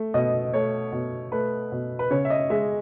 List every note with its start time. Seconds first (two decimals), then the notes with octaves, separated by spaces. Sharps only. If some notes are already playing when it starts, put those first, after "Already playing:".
Already playing: A3
0.14 B2 D#5
0.53 A3 C#5
0.92 B2
1.32 A3 B4
1.72 B2
1.99 B4
2.10 C#3 C#5
2.25 E5
2.30 D#5
2.50 G#3 E5